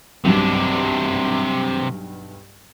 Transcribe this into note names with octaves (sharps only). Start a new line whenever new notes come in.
B1 G2 C3 D4